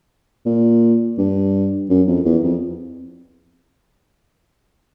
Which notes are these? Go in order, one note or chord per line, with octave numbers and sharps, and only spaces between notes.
A#2
G2
F#2
F2
E2
F2